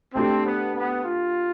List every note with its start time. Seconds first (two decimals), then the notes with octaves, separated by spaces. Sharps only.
0.14 A3 C4 D4 G4
0.45 B3
0.75 B3
1.04 F4